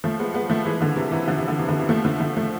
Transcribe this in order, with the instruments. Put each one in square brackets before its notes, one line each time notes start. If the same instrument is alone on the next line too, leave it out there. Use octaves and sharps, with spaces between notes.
[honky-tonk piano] F3 A3
G#3 B3
G#3 B3
F3 A3
E3 G#3
D3 F3
C3 E3
C3 E3
D3 F3
C3 E3
D3 F3
C3 E3
B2 D3
C3 E3
F3 A3
D3 F3
D3 F3
F3 A3